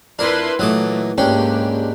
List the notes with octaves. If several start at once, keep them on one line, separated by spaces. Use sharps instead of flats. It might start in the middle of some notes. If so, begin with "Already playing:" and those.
F2 D4 E4 A#4 B4 C6
A#2 E3 F#3 A3 D#5 D6
C#2 G#2 A#3 C#4 D4 G4 G5